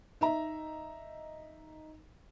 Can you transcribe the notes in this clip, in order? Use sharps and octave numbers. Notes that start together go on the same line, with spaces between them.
D#4 E5 A#5